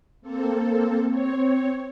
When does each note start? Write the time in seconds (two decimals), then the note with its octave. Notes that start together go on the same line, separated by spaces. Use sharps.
0.22 A#3 C4 A4
1.08 C4 C#5